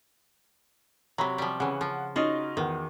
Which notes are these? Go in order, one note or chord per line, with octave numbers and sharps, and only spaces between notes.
C3 F#3 A#5 B5
F3 G3
C#3 E3 F#5
F3
C#4 D#4 F4 F#4 D#5
E2 D#3